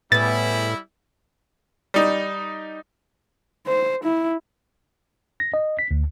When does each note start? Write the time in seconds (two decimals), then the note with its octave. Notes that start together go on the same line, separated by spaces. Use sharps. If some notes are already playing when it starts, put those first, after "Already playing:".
0.12 A2 G3 B3 E4 G#4 A6
1.94 G3 D#4
3.67 C5
4.03 E4
5.40 A#6
5.54 D#5
5.79 B6
5.91 D2